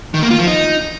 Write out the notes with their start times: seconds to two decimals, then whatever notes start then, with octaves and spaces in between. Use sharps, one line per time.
0.14 D#3
0.22 A#3
0.31 F4
0.39 F3
0.47 D#4